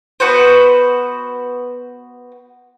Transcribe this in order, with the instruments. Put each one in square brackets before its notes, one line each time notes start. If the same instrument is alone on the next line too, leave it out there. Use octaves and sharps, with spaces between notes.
[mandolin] B3 F#4 B4 C5